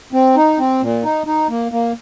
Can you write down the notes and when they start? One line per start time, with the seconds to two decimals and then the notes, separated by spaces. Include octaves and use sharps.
0.13 C4
0.36 D#4
0.59 C4
0.81 A#2
1.04 D#4
1.27 D#4
1.49 A#3
1.72 A#3